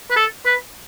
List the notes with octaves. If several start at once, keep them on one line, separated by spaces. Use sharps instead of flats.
B4
A4
B4